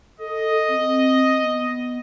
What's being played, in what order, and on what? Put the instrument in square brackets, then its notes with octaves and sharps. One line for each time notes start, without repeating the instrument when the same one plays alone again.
[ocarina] A4 [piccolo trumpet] D#5
[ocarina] C4
B3